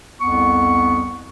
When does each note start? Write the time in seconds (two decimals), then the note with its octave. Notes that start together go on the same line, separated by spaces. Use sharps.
0.21 C2 F2 B3 C#6